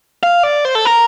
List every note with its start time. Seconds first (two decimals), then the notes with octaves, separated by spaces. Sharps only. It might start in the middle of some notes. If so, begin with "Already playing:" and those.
0.23 F5
0.43 D5
0.65 C5
0.75 A4
0.85 A#4